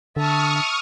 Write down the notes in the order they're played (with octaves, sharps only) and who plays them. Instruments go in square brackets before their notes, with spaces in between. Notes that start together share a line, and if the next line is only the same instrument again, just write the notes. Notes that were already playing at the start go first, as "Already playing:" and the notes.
[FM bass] D3 [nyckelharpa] E5 A5 [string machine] C#6 D#6 F6